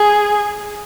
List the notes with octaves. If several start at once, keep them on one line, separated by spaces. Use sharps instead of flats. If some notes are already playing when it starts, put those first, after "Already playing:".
Already playing: G#4